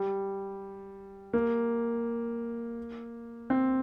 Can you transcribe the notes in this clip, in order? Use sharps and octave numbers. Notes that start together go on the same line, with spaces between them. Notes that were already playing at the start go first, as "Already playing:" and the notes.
Already playing: G3
A#3
C4